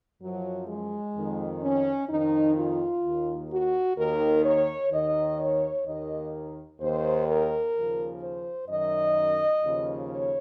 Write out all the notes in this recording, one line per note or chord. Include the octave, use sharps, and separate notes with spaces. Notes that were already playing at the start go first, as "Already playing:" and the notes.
F#2 F3 F#3
G#3
F2 D#3
C#4
F2 D#3 D#4
F4
D#2 D#3
F#4
D#2 D#3 A#4
C#5
D#2 D#3 D#5
C#5
D#2 D#3 D#5
D#2 D#3 C5
A#4
D#2 C#3 F3
C5
F#2 D#3 D#5
D#2 C#3 F3
C#5